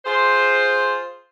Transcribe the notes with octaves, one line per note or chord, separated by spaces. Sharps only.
F4 G#4 C5